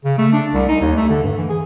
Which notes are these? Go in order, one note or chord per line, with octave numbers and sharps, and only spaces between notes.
C#3
A3
D4
C2
D#4
D#2
A3
D3
G2
E3
G#4